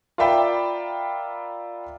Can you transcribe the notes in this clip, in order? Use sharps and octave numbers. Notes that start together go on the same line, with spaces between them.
F4 A#4 D5 E5 G5 B5